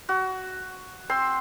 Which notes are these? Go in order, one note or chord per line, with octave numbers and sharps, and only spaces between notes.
F#4
C4 C6